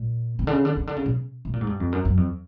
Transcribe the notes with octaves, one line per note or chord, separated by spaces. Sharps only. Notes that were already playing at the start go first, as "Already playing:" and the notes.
Already playing: A#2
C3
D3
C#3
D3
C#3
D3
C#3
B2
B2
A#2
G#2
G2
F2
F#2
F#2
F2